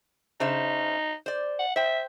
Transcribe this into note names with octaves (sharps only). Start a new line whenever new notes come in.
C#3 D#4 C5 E5
C5 D5
F#5
C5 E5 G5